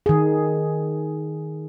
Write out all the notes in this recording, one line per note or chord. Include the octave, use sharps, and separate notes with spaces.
D#3 G#4